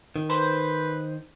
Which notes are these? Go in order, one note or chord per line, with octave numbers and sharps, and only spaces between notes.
D#3
B4 C5